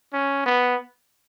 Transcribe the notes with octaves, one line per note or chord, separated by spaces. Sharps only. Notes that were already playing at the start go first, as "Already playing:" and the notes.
C#4
B3